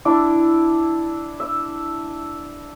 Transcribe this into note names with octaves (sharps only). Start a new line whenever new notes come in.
D4 E4 D6
E5